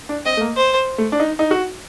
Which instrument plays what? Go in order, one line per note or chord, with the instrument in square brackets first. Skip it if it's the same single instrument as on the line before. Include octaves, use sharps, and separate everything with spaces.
[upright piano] D4
[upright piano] C4 [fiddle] D#5
[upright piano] A3
A#3
[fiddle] C5
[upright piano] A3
D4
D#4
D#4
F#4